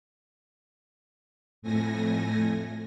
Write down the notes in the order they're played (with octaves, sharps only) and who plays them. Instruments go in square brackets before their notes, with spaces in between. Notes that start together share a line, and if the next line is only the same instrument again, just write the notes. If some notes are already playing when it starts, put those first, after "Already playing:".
[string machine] F2 A2 A3 G#5 A#6